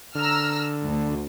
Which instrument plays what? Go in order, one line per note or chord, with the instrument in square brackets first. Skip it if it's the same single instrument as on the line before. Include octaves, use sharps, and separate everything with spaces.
[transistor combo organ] D3 [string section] A#5 E6 F6
[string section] D2